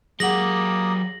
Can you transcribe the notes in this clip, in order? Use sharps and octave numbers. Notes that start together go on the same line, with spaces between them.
F#3 A#3 G4 G#4 F#5 D#6 A#6 F#7